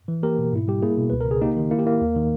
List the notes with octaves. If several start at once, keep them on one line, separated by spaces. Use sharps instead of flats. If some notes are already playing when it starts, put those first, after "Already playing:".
E3
A#3 G4 A#4
B2
G#2 E4
G3 G4
A#3 E4 G#4
B2
C#2 B4
A#4
C#3 G#4
A#3 D#4 G4
D#3
A#3 E4
G4
A#3 E4
D#2
D#3